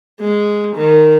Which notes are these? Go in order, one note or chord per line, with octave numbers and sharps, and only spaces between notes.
G#3
D#3